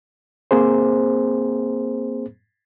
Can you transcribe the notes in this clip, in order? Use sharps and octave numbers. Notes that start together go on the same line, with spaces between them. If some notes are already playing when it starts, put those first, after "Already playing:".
A#3 C4 G#4 C5